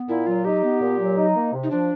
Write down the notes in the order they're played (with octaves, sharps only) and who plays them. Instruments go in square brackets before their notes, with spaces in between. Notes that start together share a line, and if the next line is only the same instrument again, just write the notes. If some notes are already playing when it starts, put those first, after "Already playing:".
Already playing: [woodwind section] B3
[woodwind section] A#2 [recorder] E4
[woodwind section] F#3 [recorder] F4
[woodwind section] D#4 [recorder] G4
[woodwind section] B3
A#2
F#3
D#4
A#3
C3
[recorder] D#4
[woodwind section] F3 [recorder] D4